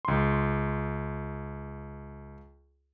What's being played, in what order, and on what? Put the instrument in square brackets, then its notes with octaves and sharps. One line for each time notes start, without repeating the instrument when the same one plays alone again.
[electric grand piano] C#2 C6